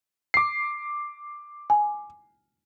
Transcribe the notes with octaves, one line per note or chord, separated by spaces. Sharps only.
D6 C7
G#5